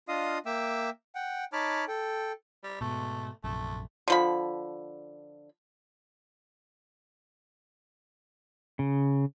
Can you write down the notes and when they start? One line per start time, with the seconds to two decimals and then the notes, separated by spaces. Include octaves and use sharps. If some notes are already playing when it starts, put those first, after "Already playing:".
0.08 D4 F4 D#5 F5 D#6
0.46 A#3 E5 G5 D6 E6
1.15 F#5 G5
1.53 D#4 C#5 A5 B5 D6 F6
1.88 A4 G5
2.64 G3
2.81 G#2 B2 A3
3.44 A#1 F#2 C3 A3
4.08 D3 F3 B5
8.79 C#3